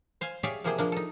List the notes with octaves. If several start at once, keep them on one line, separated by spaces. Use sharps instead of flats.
C5 F5 G#5
G4 G#4 C#5 D5 E5 F5
C3 F3 A#3 G4 G#4 C5
F3 A#3 D4
D#4 A4